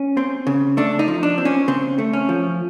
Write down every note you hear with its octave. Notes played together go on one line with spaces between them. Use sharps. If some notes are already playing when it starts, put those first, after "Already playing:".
Already playing: C#4
C4
C#3
A3 D4
D#4
F3
D4
C4
C#4
C#3 C4
A3
C#4
F3